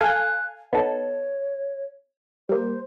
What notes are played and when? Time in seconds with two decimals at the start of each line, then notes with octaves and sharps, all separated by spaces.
0.01 A4 F5 G#5 F#6
0.73 B3 D#4 A4 C#5
2.49 G3 A#3 C5